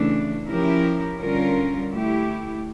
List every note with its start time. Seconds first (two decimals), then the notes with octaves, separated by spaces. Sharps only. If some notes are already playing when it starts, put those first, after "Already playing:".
Already playing: C#3 E3 A3 D4
0.46 F3 C#4 E4 G4 A#4
1.19 D3 G3 C#4 F4 A#4
1.93 A3 E4 G4